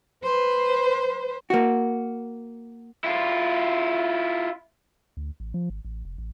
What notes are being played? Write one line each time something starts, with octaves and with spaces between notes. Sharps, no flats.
B4 C5
A#3 F#4
E4 F4
D2
A1
F3
G#1
A1
F1
A1